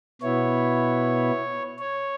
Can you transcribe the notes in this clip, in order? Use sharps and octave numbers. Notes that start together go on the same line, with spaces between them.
B2 B3 E4 C#5
C#5